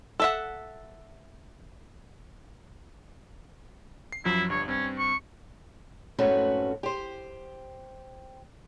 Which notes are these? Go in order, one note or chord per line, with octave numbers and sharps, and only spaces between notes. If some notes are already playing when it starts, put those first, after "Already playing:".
A4 E5 F#5
C7
F#2 F3 F#3 E4
G1 G2 C#5
G2 C4 C#4
C#6
F2 G#2 A3 C#4 F#4 B4
G4 C5